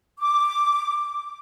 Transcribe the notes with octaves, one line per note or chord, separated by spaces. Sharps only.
D6